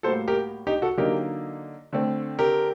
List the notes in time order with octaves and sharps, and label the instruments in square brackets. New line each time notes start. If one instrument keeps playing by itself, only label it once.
[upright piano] A2 G3 A#3 F#4 [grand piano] A4 C5
[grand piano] G4 A#4
D#4 G4
F#4 A4
[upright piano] D3 F#3 A#3 D#4 [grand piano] G4 A#4
[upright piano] D3 A3 C4
[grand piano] G4 A#4